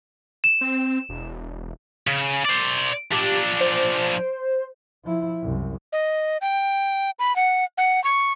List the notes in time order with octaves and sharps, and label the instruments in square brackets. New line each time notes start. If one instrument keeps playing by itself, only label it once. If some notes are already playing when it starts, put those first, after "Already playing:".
[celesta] E7
[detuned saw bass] C4
E1
[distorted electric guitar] C#3
C5 D5
[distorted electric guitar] F3 D4 [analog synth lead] G4
[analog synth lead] C5
[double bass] F3 E4
C2 F#2
[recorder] D#5
G5
B5
F#5
F#5
C#6